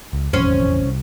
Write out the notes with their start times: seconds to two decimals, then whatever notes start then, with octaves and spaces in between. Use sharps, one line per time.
0.13 C#2
0.33 E1 A1 F2 C#4 C5
0.83 C2